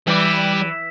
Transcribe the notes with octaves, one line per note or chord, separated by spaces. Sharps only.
E3 G3 D5